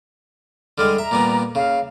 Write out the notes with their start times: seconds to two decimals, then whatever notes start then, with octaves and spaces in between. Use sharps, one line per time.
0.78 D3 G3 G#3 F6
0.99 E5 A#5
1.11 A#2 G3 B3
1.55 C#3 F5